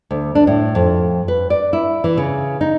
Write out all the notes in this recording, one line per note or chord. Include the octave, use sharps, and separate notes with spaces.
D2
D4
A2
F2
B4
D5
E4
E3
C#3
D#4